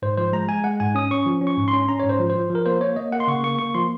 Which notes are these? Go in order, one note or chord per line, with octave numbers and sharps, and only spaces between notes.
G#2 C5
F3 C5
G#3 A#5
G#3 G#5
G#3 F#5
G#2 G#5
C#4 D#6
C#4 C#6
F3
C#4
C#6
G#2
C6
C#4
C#4 A#5
G#2 C#5
C5
F3
C5
F3
F3 A#4
A#3 C5
A#3 C#5
A#3 D#5
A#3 F#5
C6
C#3 C#6
A#3 C#6
A#3 C#6
F3 C6